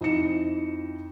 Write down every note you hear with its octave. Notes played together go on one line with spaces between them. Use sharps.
F2 D#4 E4 C#7 E7